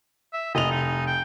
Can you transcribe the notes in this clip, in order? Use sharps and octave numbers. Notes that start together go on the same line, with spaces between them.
E5
F1 D#5 F7
D#4
G5